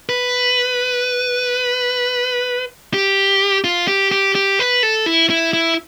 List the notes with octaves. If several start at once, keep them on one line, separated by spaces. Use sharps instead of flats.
B4
G4
F4
G4
G4
G4
B4
A4
E4
E4
E4